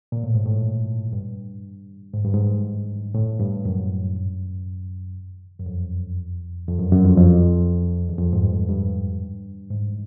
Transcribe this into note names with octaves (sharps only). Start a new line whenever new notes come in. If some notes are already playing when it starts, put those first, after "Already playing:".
A#2
A2
G#2
A2
G2
G#2
G2
G#2
A2
G2
F#2
F#2
F2
F2
F#2
F#2
F2
F2
E2
F2
G#2
G2
G2
G#2